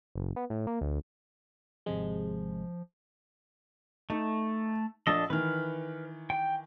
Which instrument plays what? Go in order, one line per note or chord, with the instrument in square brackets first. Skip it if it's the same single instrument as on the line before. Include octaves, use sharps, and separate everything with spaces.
[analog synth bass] F#1
B3
A2
A#3
D2
[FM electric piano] G#1 C3 G#3 [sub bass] F3
[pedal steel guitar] A3 [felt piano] D#4
[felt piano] A#1 [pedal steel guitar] D4 A4 D#5
[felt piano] D#3 E3 [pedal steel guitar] B4 F6
[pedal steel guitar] G5